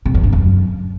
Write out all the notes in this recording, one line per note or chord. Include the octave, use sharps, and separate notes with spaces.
C3
E2
G2
F#2